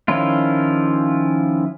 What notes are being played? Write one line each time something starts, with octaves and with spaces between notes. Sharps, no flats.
D#3 F3 C#4 E4 F4